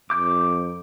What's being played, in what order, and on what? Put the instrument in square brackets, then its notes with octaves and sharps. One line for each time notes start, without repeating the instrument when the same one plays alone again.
[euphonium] F2 [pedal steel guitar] D6 G6